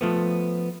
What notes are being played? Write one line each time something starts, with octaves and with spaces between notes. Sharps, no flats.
F3 A3 B3